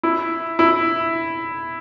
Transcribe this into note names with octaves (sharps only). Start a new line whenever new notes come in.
E4
E4